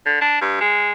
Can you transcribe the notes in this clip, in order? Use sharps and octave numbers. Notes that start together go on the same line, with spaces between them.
D3
D4
G2
G#3